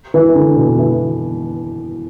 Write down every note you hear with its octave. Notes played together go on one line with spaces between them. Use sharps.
E3
D3
B2
E3